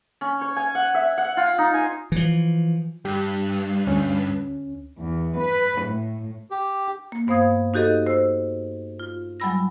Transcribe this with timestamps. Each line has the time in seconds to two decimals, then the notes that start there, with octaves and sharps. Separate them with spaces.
0.21 C#4
0.41 C#5
0.56 G#5
0.75 F#5
0.94 E5
1.18 F#5
1.37 F4
1.58 D#4
1.74 G#5
2.12 E3 F3
3.05 G2 G4
3.87 D2 C#4
4.99 E2
5.39 B4
5.82 A2
6.51 G4
7.12 A#3
7.27 G2 B3 C5 F5 D#6 G#6
7.74 D#4 F#4 G4 A4 D#5
8.07 C5 E6
9.00 F4
9.40 F#3 G3 G#5 B5 E6 A#6